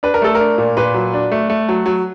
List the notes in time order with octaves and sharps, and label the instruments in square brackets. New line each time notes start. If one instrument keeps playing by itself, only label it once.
[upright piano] D4 B4
A#4
A3 A4
D4 A#4
A#2
A#2 B4
F#3
D4
A3
A3
F#3
F#3